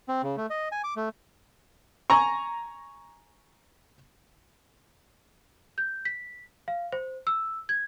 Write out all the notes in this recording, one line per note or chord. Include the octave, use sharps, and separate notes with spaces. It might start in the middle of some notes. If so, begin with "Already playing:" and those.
C4
C#3
A3
D#5
G#5
D6
A3
G#5 A#5 C#6
G6
B6
F5
C5
E6
G#6